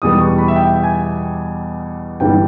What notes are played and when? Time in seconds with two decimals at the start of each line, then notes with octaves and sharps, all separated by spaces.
0.02 E2 B2 G3 B3 D#6
0.13 D#6
0.20 C#6
0.38 B5
0.48 E5
0.56 G5
0.83 G#5
2.20 G1 G2 E3 G3 G5